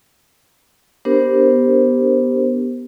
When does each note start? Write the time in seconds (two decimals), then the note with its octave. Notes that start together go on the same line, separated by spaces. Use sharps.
1.05 B3 D4 G4 A#4 C5